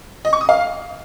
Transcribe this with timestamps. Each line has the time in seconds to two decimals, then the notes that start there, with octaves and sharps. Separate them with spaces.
0.25 D#5
0.33 C#6
0.41 D#6
0.49 F5